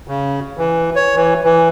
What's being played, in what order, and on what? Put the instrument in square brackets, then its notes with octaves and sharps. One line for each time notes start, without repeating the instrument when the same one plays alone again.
[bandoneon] C#3
E3
C#5
E3
E3